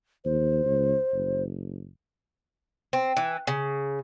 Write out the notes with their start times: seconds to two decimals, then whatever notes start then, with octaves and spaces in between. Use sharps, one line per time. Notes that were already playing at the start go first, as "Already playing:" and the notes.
0.25 D#2 C5
0.64 C#2
1.13 F#1
2.93 C4
3.17 E3
3.47 C#3